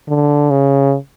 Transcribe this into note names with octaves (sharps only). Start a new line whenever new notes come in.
D3
C#3